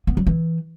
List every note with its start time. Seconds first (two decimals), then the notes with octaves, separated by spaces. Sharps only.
0.07 B3
0.17 F#3
0.27 E3